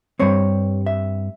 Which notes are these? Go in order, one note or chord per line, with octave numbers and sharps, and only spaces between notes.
G2 G3 C4 C#5
E5